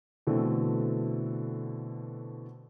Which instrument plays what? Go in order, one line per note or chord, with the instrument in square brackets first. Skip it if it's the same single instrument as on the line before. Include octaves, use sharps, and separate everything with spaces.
[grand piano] B2 D3 E3 A3 C4